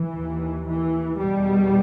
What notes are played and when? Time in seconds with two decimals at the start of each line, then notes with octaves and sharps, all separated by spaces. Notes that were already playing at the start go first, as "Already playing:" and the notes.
Already playing: E3
0.14 D#2
0.66 E3
1.17 E2 B2 G3